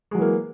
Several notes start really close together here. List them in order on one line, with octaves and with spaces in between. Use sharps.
G#3 F#3 E3 A#3